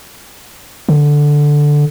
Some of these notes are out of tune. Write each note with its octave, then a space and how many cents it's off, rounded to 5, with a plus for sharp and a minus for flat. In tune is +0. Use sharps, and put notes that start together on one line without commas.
D3 +0